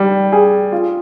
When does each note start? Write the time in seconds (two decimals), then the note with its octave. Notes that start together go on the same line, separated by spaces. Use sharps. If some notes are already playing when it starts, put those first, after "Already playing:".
Already playing: G3
0.32 G#4
0.72 F4